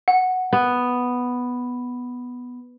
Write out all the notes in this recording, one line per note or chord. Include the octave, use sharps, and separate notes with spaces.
F#5
B3